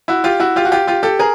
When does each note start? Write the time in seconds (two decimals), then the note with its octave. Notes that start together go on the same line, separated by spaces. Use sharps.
0.08 E4 F#4
0.24 F4 G4
0.40 E4 F#4
0.56 F4 G4
0.65 F#4
0.72 F4 G4
0.87 F4 G4
1.03 G4 A4
1.19 G#4 A#4